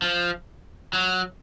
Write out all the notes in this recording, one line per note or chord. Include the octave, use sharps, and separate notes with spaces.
F3
F#3